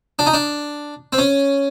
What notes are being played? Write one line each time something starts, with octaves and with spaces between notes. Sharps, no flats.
D4
D#4
D4
C4
C#4